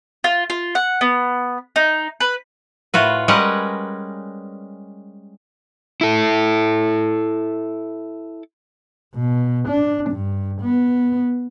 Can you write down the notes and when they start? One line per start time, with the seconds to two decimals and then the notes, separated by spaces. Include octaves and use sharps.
0.24 F4
0.50 F4
0.75 F#5
1.01 B3
1.76 D#4
2.20 B4
2.94 A2 F4 F#4 B4
3.28 G3 G#3 C#4 A#4 B4 F#5
6.01 E4 A4
9.14 B2
9.68 D4
10.10 G2
10.61 B3